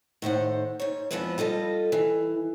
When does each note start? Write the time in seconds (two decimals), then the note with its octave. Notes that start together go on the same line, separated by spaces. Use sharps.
0.22 A2 D#3 C5 F#5
0.80 G#2 C#5
1.11 F2 F3 G#3 B3 E4 B4
1.38 G3 F4 A4 D#5
1.92 E3